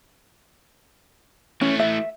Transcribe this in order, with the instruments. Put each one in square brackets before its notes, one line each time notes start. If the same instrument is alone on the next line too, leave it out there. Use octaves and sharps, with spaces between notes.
[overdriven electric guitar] E3 A3 [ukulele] C#4
[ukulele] E5